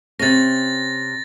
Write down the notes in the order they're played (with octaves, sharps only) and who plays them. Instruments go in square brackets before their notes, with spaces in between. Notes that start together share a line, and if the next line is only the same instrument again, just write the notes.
[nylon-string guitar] C3 C#4 [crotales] A6 A#6